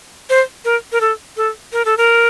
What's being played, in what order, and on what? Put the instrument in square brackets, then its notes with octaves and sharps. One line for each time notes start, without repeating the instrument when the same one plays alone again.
[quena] C5
A#4
A#4
A4
A4
A#4
A4
A#4